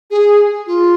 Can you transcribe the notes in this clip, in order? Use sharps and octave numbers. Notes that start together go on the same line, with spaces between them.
G#4
F4